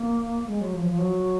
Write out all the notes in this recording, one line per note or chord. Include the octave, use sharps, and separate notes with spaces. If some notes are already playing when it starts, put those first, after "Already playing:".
Already playing: A#3
A#3
G#3
F#3
F3
F3
F#3